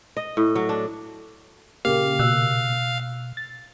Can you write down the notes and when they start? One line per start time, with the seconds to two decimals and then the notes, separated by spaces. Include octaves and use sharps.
0.17 D#5
0.37 A2
0.55 F#3
0.69 D4
1.85 A#2 C#3 A#3 G4 F5
2.19 B2 E6 F#6
3.37 A6